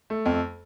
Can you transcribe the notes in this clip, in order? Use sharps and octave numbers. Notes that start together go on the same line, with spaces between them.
A3
F2